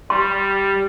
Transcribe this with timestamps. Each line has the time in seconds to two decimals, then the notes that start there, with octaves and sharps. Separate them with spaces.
0.10 G3 G4 C6